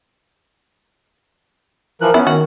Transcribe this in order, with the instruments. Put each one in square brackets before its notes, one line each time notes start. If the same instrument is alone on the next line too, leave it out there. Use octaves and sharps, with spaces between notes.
[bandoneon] E3 F3 F#6 [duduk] A#4
[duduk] B3 [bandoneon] C#4 [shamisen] E4
[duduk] D#3 [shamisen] F#4